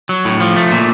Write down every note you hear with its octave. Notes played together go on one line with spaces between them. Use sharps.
F#3
A2
F3
A3
A#2